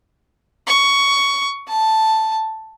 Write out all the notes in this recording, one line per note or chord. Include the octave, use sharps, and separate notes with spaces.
C#6
A5